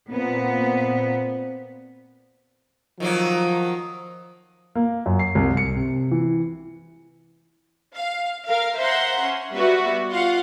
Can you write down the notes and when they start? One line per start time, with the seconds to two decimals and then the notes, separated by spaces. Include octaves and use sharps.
0.12 A#2 B3 C4
3.00 D#3 F3 F#3 A#3
4.75 A#3
5.06 F#2
5.19 C7
5.35 C2
5.57 C#7
5.76 C3
6.11 E3
7.95 F5
8.48 A#4 F5
8.78 C5 E5 F#5 A#5 C6
9.21 C#4
9.54 G3 B3 F#4 B4 E5
10.10 F4 F5 F#5 C6